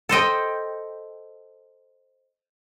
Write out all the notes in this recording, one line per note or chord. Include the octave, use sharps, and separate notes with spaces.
A4 C5 D#5 G5